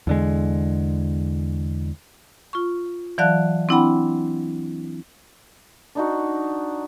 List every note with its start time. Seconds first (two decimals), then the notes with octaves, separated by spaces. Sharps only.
0.07 E2 D3 G#3
2.53 F4 C#6
3.18 E3 F#3 D5 F5 A5 F#6
3.69 C4 D4 E4 F#5 G5 B5
5.95 D4 D#4 F#4